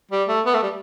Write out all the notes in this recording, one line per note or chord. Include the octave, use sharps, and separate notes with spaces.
G3
A3
B3
A3
G3